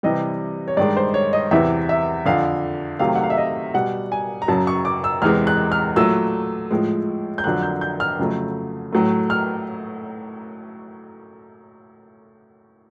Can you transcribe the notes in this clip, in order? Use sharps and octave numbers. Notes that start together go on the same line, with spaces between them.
C3 E3 G3 D#5
C#5
G2 D#3 G#3 D5
C5
C#5
D#5
E2 C3 E3 E5
E5
F2 D3 F3 F5
C3 D#3 F#3 A3 F5
F#5
F5
E5
D#5
B2 G3 F#5
G#5
A#5
F#2 C#3 F#3 A5
C#6
D6
E6
E2 C3 E3 G#3 F6
F#6
F6
A#2 F#3 A3 E6
A2 F3 G#3
G6
F2 D3 F#3 F#6
G6
G6
F6
F2 C#3 F#3 A3
A2 F#3 A3
F6